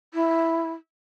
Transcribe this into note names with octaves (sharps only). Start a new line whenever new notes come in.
E4